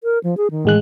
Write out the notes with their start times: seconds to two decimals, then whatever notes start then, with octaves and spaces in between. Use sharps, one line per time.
0.04 A#4
0.24 F3
0.37 G#4
0.51 D#3
0.65 A1 G#3 F#6